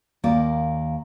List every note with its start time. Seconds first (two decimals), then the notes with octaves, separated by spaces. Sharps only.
0.23 D#2 A#3 D5